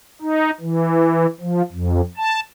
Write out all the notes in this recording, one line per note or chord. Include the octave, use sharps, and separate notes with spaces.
D#4
E3
F3
F2
A5